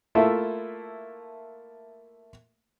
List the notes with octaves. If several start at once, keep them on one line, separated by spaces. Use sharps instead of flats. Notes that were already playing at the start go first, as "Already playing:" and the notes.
A3 A#3 E4 F4 A4